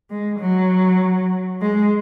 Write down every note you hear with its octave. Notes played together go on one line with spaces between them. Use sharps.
G#3
F#3
G#3